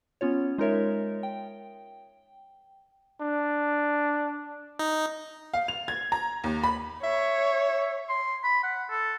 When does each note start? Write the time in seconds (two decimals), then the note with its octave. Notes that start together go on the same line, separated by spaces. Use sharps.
0.21 B3 C#4 F4 C#5
0.58 G#3 D#4 F4 A#4 C#5 E5
1.23 G5
3.21 D4
4.79 D#4
5.54 F5
5.68 F7
5.88 G#6
6.12 A#5
6.44 D#2
6.64 B5
7.03 C#5 E5
8.09 C6
8.44 B5
8.63 F#5
8.90 A4